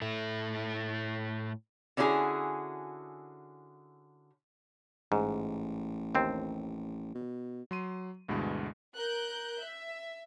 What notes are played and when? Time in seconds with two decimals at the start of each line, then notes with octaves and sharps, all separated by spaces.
0.02 A2 A3
1.97 D3 C#4 E4 F#4 G#4
5.12 A1 G#2
6.15 D#2 C4
7.15 B2
7.71 F#3 C6 D#7
8.28 D2 G2 B2 E3 G#3
8.95 A#4 F#6 G6
9.61 E5